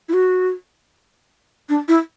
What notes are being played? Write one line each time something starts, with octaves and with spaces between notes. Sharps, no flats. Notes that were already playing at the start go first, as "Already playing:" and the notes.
E4
F#4
D4
E4